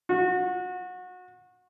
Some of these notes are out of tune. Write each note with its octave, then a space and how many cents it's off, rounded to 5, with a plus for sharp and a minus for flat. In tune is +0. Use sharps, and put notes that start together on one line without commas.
F#4 -25